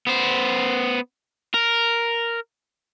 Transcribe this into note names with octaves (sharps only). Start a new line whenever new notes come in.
B3 C5
A#4